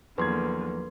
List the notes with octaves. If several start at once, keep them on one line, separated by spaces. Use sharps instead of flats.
E2 D3 F3 F#3 A#3 B4 C6 G#6